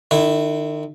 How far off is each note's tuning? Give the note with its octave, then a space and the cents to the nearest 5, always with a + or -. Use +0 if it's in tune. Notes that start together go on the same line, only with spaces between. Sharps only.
D#3 -40 E4 +0